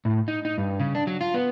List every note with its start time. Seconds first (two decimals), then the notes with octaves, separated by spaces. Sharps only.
0.05 A2
0.28 D#4
0.45 D#4
0.58 G2
0.79 C#3
0.95 D4
1.07 F#3
1.21 F4
1.34 B3